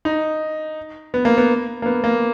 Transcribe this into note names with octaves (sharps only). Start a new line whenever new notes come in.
D#4
B3
A#3
B3
A#3
B3
A#3